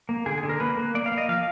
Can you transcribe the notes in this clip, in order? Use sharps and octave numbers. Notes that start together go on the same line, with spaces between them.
A#3
D3 G#4
G#4
D3
A#4
A#3 B4
A#3
A#3 D5
F5
A#3
D#5
F3 F5